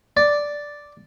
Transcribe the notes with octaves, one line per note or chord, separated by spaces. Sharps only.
D5